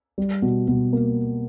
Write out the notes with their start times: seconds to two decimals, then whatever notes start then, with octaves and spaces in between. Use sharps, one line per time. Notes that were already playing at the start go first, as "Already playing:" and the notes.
0.18 G3
0.42 B2
0.68 B2
0.93 A#3